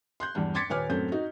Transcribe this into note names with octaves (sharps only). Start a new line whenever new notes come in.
C6 F#6 G6
E2 G2 D4
C6 D6 G#6 A6 B6 C#7
D#1 B4 C#5 G#5 D6 F6
F#2 A2 A3 C4 G6
D#4 F#4